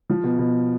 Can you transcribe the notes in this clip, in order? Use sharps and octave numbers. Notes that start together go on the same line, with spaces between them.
F3
B2
B2